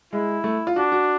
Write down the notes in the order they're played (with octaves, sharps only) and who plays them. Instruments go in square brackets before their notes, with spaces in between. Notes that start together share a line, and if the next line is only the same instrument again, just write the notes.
[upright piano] G#3 [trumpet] E4
[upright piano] A3
F4
[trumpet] D4 [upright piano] F#4
[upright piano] F#4